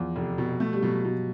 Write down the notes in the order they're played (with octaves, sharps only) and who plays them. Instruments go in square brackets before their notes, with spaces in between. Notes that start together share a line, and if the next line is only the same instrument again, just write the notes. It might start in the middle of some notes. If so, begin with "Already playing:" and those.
Already playing: [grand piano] E2 [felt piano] F3
[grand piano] F1
B2
A3
[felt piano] G3
[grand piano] B2 [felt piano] F#3
[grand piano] B2